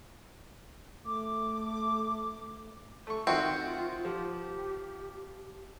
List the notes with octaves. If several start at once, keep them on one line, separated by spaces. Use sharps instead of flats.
A3 D6
A3 C#6
D#3 C4 F4 F#4 E5
F3 G4